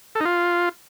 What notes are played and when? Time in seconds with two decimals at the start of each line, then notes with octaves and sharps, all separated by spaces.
0.15 A4
0.20 D#4
0.25 F4